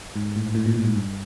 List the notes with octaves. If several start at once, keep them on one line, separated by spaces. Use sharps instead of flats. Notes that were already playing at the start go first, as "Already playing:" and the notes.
G#2
A2
A2
A#2
A2
G#2
G2